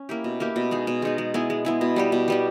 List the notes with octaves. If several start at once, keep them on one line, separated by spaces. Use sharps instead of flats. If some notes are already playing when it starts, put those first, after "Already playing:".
Already playing: C#4
A#3 E4 G4
B2
A#3 E4 G4
B2
G#3 D#4 G#4
B2
G#3 D#4 G#4
G#3
B3 E4 G#4
G#3
B3 E4 G#4
B2
G3 B3 G4
B2
G3 B3 G4